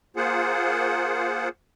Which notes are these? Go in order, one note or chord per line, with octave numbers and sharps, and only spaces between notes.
A#3 F4 G#4 C5 F#5